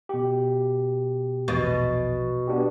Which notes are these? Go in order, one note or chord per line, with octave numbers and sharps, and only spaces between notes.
B2 G4
A#1 E2 B2 A6
B3 D4 G4